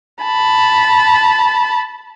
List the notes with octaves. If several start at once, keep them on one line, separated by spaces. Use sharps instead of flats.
A5 B5